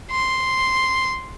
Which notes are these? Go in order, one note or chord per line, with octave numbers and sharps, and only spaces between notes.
C6